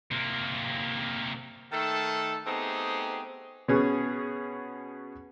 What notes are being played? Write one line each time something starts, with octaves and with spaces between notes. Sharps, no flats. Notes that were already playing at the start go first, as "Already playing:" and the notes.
C3 A#3
D#3 A3 A4
A3 B3 C4 D#4 G4 G#4
B2 B3 C#4 G#4